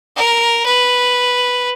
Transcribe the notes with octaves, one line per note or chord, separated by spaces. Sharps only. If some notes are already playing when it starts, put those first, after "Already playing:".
A#4
B4